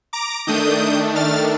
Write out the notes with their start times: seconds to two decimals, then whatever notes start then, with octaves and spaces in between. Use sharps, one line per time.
0.13 A#5 D6
0.47 D#3 A3 D4 D#6 G6
1.16 F6 A6